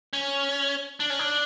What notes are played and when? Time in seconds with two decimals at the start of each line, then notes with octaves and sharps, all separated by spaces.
0.13 C#4
1.00 D4
1.10 C#4
1.19 D4